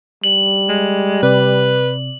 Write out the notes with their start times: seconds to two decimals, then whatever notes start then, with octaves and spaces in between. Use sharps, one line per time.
0.24 G3 F#7
0.69 G#3
1.23 C3 B4 D5